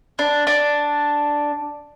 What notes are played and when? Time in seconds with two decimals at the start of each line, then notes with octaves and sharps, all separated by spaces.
0.19 D4
0.47 D4